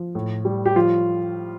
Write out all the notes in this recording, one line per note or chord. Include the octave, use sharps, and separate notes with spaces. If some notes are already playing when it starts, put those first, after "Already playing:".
Already playing: F3
A2
G3
G4
F3 F4